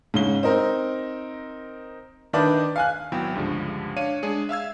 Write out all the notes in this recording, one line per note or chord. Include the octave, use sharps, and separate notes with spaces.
G#2 C#3 G7
C4 D#4 A#4
D#3 D4 D#4 B4 D5
F5 G#5 F#6
G#1 F#3 B3 E4 G5
C#2 G2 D3 F3 G#3
D4 C#5 F5 D#7
G#3 D4 G#4
E5 F5 E6 G#6